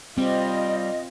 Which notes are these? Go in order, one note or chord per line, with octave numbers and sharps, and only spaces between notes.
G3 C4 F4 D#5